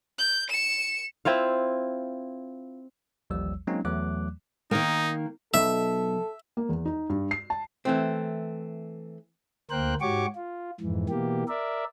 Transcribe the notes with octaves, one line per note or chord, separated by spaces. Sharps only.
G6
C#7 E7
C4 E4 F4 F5
A1 D#2 F3 G3 E6
F#3 G#3 A#3 C4 C#4 D#4
E2 E3 F#3 A3 D6 F#6
D#3 A#3 D#4
B1 A4 E5
A#3
E2
D#4
G2
C7
A5
E3 A3 C4
D2 A#3 A#4 C5 G5 F#6
G#2 F#4 G4 C#5 C#6 D6
F4
F2 G#2 E3
B2 E3 A#3 G4
A#4 D5 E5